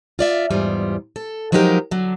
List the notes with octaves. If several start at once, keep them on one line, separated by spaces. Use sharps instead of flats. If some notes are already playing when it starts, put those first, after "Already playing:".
F4 D5 E5
E2 G#2 G3 F4
A4
F3 F#3 G#3 D#4 G4 A#4
D3 F#3